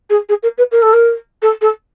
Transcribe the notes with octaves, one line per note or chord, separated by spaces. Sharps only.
G#4
G#4
A#4
B4
A#4
A4
A#4
A4
A4